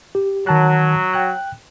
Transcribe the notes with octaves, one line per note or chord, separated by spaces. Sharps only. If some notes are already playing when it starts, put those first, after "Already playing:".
G4
D#3 F#3 A5 F#6
G5 F#6